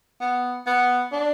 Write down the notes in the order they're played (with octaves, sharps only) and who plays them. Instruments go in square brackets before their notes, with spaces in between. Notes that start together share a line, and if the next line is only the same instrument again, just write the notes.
[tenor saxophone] B3
B3
D4